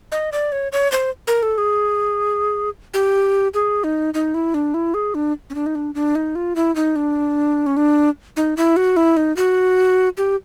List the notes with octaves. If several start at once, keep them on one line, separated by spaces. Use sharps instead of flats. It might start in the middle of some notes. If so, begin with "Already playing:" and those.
D#5
D5
C#5
C#5
C5
A#4
A4
G#4
G4
G#4
D#4
D#4
E4
D4
E4
G#4
D4
C#4
D4
D#4
D4
D4
D#4
F4
E4
D#4
D4
C#4
D4
D#4
E4
F#4
E4
D#4
F#4
G4